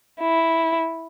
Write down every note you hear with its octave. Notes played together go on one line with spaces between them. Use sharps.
E4